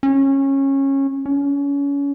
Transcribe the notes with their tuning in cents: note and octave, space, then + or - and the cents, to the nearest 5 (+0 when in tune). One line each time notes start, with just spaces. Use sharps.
C#4 -20
C#4 +30